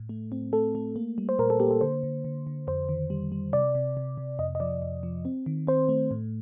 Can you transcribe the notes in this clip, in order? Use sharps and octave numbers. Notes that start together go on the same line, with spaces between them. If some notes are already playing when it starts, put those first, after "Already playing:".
Already playing: A2
A3
C4
A3 A4
A3
A#3
G3
C5
A#2 A#4
A4
A#3 G4
A4
D3 C5
D3
D3
D3
F2 C5
D#3
G3
G3
C3 D5
C3
C3
C3
F2 D#5
D#5
F3 D5
F2
F3
C4
D#3
C4 C5
A3
A2